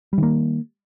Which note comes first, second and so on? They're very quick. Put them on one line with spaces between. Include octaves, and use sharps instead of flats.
G3 D#3 A#3